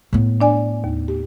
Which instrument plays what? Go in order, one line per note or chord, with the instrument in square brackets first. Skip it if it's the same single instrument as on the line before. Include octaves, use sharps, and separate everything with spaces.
[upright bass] A2 B3
[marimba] D4 D5 G#5
D#2
G4